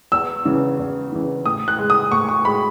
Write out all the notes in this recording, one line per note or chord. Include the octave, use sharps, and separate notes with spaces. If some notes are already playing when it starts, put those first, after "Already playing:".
E2 E6
C#3 E3
E2
C#3 E3
A2 D#6
F#6
G#3
D#6
A2 C#6
C#6
G#3 B5